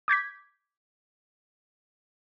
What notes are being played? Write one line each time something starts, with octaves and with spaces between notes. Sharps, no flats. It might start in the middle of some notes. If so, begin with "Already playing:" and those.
D6 G6 G#6 B6